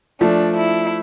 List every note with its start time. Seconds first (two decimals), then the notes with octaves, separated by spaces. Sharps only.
0.21 F3 A3 D4
0.57 E4